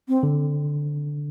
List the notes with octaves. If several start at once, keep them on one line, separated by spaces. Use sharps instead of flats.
C4
D3